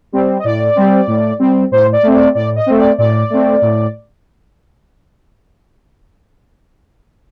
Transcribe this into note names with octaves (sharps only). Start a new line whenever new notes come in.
G3 C4
D#5
A2 D5
G3 C4
A2
G3 C4
A2 C5
D5
A3 C4
D5
A2 D5
D#5
A3 C4
D5
A2 D5
A3 C4
A2